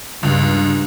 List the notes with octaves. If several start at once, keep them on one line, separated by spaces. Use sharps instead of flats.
C#2 G2